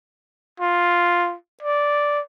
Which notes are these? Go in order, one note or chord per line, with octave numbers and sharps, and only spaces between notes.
F4
D5